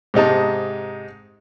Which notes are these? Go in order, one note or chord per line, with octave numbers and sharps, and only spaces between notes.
G#2 C3 D#4 A5